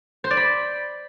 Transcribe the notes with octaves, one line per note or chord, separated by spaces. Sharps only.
C5
D5
B5